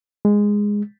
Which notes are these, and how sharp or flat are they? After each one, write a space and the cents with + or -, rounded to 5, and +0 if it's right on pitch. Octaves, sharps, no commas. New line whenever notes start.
G#3 -10